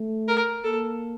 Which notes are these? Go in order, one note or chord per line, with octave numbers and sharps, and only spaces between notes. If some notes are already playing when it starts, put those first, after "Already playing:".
Already playing: A3
A#4
A#3 A4